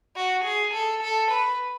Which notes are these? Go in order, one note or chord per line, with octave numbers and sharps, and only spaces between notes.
F#4
G#4
A4
A4
B4